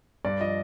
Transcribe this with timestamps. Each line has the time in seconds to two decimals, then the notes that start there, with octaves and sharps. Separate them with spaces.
0.25 G2 D5
0.40 F3 D#5